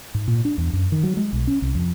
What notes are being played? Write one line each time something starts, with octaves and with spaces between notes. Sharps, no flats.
G#2
A#2
D4
E2
F#2
D#3
F#3
G#3
B1
C#4
C2
F2